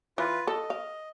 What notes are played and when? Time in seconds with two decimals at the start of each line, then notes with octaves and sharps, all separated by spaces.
0.18 E3 F4 B4
0.47 A4 D#5
0.70 F5